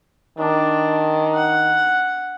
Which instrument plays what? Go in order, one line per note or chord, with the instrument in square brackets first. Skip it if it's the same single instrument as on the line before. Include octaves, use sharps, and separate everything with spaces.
[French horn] D#3 [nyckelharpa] D4
[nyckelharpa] F#5